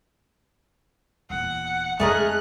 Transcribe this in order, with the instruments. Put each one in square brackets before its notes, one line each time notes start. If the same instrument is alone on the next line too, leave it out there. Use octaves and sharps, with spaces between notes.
[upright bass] D#1 E2 [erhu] F#5
[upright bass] F2 C4 [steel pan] G#3 [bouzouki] A3 G#4 A#4 [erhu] F#6